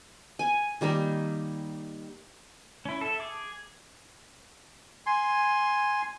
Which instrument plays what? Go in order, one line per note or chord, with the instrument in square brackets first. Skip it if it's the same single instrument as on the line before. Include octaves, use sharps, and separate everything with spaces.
[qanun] G#5
D#3 G3 A#3 D#4
[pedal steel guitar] C#4 E4
A4 E5
G#4 D6
[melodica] G#5 C6